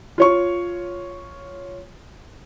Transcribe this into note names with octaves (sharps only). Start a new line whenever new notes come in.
F4 C#5 C#6